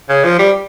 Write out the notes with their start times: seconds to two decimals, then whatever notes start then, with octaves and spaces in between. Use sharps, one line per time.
0.09 C#3
0.24 F3
0.39 G3